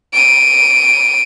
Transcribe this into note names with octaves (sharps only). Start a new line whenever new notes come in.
D7 D#7